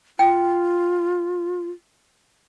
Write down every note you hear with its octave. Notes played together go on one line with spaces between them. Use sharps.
F4 G5